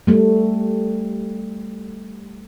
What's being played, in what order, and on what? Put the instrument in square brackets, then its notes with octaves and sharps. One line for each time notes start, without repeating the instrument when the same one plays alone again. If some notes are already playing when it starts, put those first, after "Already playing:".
[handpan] G3 A3